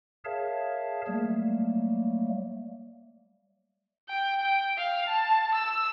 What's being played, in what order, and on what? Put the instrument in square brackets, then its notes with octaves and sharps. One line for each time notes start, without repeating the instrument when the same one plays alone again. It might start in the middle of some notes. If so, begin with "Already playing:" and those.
[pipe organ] G#4 A#4 C#5 E5 F5 A5
F#3 G3 A3 A#3
[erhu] G5
G5
F5
A5
E6